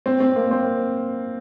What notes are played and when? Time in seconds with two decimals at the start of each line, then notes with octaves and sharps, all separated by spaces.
0.06 C4
0.20 C4
0.36 A#3
0.51 C4